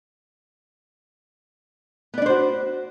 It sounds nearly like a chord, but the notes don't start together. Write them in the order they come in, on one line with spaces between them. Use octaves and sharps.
B3 D5 D4 C5 F#4